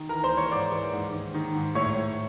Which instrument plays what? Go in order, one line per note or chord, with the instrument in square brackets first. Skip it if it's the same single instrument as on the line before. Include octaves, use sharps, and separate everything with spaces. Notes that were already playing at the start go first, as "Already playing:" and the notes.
Already playing: [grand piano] D#3
E3 A#4 A#5
C5 C6
E3
C#5 C#6
G#2 D5 D6
E3
G#2
D#3
D#3
G#2
A2 C#5 C#6
A2